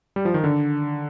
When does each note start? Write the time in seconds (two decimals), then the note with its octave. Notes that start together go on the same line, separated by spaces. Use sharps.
0.16 G3
0.25 F3
0.34 D#3
0.44 D3